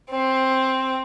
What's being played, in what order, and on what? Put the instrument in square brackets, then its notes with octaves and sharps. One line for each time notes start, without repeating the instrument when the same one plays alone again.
[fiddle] C4